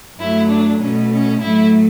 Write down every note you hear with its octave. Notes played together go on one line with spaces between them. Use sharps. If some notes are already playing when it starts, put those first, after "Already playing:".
G2 F#3 A3 E4
D4
B2 A3 C#4
C#4
A2 F#3 A3 E4